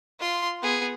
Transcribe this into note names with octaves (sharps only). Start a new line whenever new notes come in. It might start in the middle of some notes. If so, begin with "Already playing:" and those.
F4 C6
B3 G#4